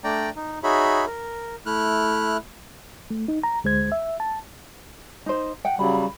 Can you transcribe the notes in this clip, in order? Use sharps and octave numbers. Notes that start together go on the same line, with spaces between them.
A3 D4 D5 G5 A#5
D#4
D#4 F#4 G#4 C#5 E5 B5
A#4
A3 E4 F6 F#6
A3
D#4
A#5
D2 G#3 C5 G#6
E5
A5
D#4 C5
F#5 G5
C#3 F#3 G3 B5